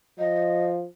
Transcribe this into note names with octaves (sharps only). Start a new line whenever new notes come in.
F3 D#5